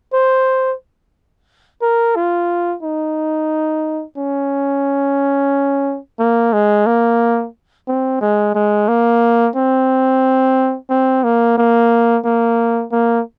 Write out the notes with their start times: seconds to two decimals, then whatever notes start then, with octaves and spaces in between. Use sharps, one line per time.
0.13 C5
1.82 A#4
2.16 F4
2.83 D#4
4.17 C#4
6.19 A#3
6.53 G#3
6.87 A#3
7.88 C4
8.21 G#3
8.55 G#3
8.88 A#3
9.56 C4
10.90 C4
11.24 A#3
11.58 A#3
12.25 A#3
12.92 A#3